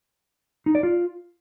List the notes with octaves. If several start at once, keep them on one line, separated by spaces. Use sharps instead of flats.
D#4
D5
F4